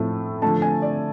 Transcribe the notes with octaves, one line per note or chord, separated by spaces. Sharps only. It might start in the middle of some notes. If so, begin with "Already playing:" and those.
Already playing: A2 F3 A3
D3 F3 A3 A5
G#5
D5